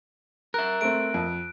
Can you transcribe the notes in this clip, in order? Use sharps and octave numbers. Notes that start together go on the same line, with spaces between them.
A#4 E5 F#6
A3 C4 D7
F2